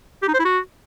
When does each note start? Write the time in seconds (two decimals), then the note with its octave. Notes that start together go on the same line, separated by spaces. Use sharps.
0.23 G4
0.28 D#4
0.34 C5
0.39 E4
0.45 F#4